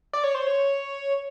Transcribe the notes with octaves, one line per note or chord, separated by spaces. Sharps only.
D5
C#5
C5
C#5